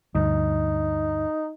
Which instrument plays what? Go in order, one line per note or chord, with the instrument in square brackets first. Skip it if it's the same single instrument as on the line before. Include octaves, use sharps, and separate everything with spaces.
[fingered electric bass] D2 G2 [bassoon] D#4